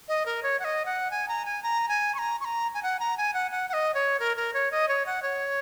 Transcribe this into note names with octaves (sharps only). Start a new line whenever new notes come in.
D#5
A#4
C#5
F#5
D#5
F#5
G#5
A#5
G#5
A#5
G#5
C#6
A#5
C#6
A#5
G#5
F#5
A#5
G#5
F#5
F#5
F#5
D#5
C#5
A#4
A#4
C#5
D#5
C#5
F#5
C#5